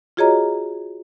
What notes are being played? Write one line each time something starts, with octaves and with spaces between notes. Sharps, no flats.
F4 F#4 G#4 C#5 D#5 A#5